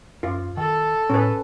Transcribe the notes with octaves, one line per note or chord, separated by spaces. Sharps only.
F#2 F4
D#3 A4
A2 C#4 B4